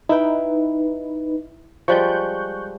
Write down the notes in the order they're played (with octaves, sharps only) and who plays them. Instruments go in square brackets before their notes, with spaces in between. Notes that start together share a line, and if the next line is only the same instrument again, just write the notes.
[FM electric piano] D#4 B4 [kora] E4 G5
[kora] F3 G3 G#3 [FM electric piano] C#6 F#6 G6